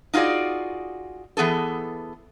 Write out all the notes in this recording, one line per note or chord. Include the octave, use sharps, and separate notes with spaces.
D#4 F4 F#4 G#4 D5
E3 B3 G#4 A4